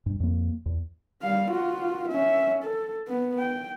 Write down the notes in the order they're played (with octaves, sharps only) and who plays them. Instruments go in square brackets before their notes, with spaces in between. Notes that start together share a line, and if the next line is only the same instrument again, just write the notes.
[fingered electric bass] G2
F2 A#3
E2
[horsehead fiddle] G3 F5
F4 F#4
C#4 E5
A4
B3
G5